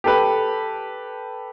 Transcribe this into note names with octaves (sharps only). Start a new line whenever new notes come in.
G4 A4 B4